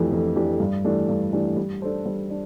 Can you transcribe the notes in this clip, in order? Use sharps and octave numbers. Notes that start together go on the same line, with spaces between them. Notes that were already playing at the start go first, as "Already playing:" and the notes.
Already playing: F2 E3 A3 D4 G4
F2
E3 A3 D4 G4
G2
E3 A3 D4 G4
G2
E3 A3 D4 G4
G3
D4 A4 C5
G3
D4